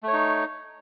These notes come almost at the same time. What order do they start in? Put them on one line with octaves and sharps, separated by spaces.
A3 C#5 D#4